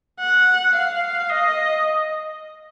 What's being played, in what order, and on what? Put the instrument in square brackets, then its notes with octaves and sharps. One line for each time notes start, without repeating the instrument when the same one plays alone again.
[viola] F#5
F5
D#5